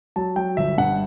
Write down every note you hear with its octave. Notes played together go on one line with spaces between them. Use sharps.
F#3 A5
F#3 G5
G1 E5
G2 F#5